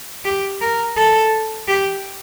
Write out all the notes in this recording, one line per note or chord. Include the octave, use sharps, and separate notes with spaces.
G4
A#4
A4
G4